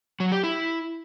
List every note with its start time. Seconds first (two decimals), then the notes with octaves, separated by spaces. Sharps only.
0.20 F#3
0.32 G4
0.43 E4